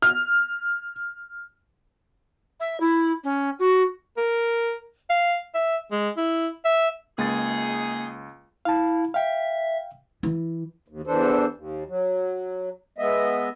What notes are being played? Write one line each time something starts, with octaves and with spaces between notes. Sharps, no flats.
F6
E5
E4
C#4
F#4
A#4
F5
E5
G#3
E4
E5
C#2 A#3 D#4 G#4 A6
E4 F5 A5
E5 F5 G5
E3
D#2
E2 E3 D4 A4 C5
D#2
F#3
G#3 B3 D#5 E5